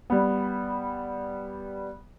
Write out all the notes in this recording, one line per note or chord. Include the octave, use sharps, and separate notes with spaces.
G3 B3